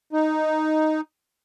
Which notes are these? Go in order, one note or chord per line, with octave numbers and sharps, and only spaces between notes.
D#4